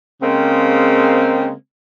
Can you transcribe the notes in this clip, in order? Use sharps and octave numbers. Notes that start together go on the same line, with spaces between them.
C#3 G#3 A#3 C4